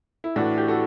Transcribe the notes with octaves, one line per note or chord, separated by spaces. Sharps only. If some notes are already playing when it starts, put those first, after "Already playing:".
E4
A2 E3 D4 F#4
G4
F#4 A4